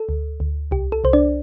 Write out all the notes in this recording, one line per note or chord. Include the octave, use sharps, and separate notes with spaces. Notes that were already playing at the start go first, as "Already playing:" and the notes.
Already playing: A4
D2
D2
C2 G4
A4
C2 C5
D4 D5